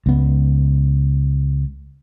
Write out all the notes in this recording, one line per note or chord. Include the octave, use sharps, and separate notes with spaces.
C#2 B3